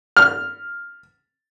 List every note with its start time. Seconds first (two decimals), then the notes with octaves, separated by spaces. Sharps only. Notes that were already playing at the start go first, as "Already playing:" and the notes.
0.17 F6